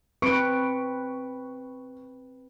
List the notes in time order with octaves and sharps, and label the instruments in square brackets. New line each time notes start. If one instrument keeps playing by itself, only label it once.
[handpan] C4 B4 [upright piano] C#6 C#7 D7